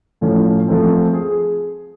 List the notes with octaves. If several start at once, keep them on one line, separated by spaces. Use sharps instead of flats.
A2 F3 A3 C#4
F3 A3 C4
G#4